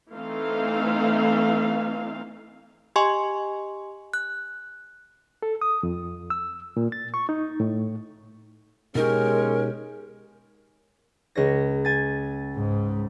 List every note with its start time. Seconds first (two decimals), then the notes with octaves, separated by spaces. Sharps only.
0.12 E3 A3 C4 D#4 F5
2.96 G4 D#5 G#5 C6 C#6
4.14 F#6
5.42 A4
5.61 D#6
5.83 F2
6.30 E6
6.77 A#2
6.92 A6
7.14 C#6
7.29 D#4
7.60 A2
8.95 B2 G#3 C#4 D#4 G4 A#4
11.35 C#2 C#5 A#6
11.85 G#5 A6
12.54 G#2